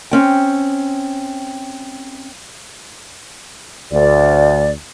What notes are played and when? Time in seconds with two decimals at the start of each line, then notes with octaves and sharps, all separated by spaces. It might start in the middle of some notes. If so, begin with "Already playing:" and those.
0.11 C4 C#4 G5
3.91 D2 D5